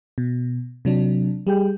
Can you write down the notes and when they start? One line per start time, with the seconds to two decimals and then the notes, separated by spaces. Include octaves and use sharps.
0.18 B2
0.85 C3 F#3 D4
1.47 G3 G4 G#4 G5